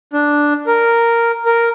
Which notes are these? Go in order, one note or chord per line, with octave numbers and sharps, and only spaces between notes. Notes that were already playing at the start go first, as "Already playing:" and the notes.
D4
A#4
A#4